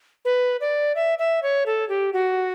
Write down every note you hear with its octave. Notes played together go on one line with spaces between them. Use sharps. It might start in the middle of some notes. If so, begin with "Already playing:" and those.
B4
D5
E5
E5
C#5
A4
G4
F#4